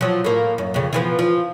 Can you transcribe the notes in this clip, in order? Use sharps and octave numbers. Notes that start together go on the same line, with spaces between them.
F3 F#3
A2 A#3
F#2
F2 C#3
E3 F3 B3
F3